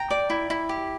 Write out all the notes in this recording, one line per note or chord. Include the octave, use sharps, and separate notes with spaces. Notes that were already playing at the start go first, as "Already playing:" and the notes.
Already playing: G5 A#5
D5
E4
E4
G4